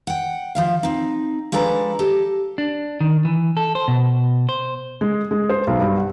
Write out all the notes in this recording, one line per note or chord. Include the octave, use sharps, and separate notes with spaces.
F#5 G5
F3 E5 F5
C4 D#4
F3 G#3 D4 A4 B4 A#5
G4 A4 D#5
D4
D#3
E3
A4
C5
B2
C5
G#3
G#3
C5
B1
G2
F#5